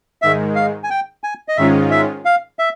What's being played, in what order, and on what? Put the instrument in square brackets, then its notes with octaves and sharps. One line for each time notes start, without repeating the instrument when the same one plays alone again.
[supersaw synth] G#2 D#3 G#3 [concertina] E5
[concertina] F5
G#5
G5
G#5
D#5
[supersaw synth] G#2 D#3 G#3 C#4 F4 [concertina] E5
[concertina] E5
F5
E5